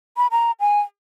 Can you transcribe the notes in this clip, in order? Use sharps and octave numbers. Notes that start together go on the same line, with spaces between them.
B5
A#5
G#5